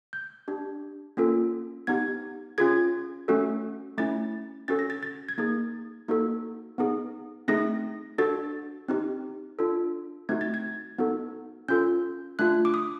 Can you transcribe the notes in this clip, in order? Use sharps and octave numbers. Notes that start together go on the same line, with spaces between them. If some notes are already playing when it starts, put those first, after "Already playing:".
G6
D4 G4
A#3 C#4 F4 A4
B3 D#4 G4 G#6
C#4 F4 G#4 G#6
A3 C#4 F#4 A4
A3 C#4 E4 A6
C#4 F#4 A4 A6
A#6
A6
A6
G#6
A#3 D#4 G#4 A6
A#3 D#4 F#4 A4
B3 D#4 G#4
A3 C4 D#4 G#4 A#6
D4 F#4 A4 A6
C4 D#4 G4
D4 F4 A4
A3 C4 D#4 F#4 G#6
A6
G#6
B3 D#4 F#4 A4
C#4 F4 A4 G6
A3 D4 F4 F#6
D6
D#6